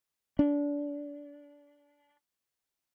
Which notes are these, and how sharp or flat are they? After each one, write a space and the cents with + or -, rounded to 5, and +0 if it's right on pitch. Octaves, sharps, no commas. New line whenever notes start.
D4 -25